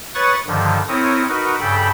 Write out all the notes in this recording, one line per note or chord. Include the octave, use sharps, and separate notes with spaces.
B4 C#5 C#6 D#6 F#6 A6
G2 D3 D#3 F3
C4 E4 A#4 C#5 D#6
D#4 F#4 A#4 B4
G2 C#3 A4 G5 B5